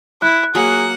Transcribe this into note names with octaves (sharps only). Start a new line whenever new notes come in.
E4 F#6
F#3 A#3 G#4 F#5